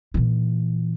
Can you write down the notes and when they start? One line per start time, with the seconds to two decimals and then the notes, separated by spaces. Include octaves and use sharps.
0.14 A#2 E3